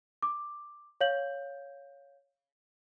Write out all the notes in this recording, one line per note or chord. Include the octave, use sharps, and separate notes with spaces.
D6
C#5 F5 G6 F#7